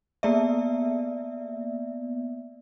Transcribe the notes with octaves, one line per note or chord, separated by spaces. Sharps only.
A#3 B3 D5 E5